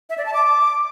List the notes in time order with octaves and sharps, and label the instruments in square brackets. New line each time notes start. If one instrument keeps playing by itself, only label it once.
[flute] E5
D5
A5
D6